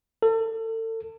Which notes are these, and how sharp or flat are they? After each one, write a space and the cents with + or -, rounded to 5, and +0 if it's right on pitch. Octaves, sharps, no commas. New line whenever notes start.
A4 +35